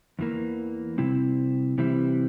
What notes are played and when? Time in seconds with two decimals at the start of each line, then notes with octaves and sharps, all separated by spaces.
0.19 E2 E3 A#3
0.98 C3 G3 C4 E4
1.78 C3 E3 G3 C4 E4